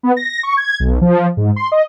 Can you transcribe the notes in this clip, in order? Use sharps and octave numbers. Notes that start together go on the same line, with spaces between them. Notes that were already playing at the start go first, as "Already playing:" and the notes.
B3
A#6
C#6
G#6
B1
F3
G#2
C6
D#5